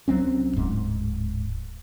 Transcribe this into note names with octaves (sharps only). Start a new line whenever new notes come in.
C2 F#3 C4 C#4
D1 G#2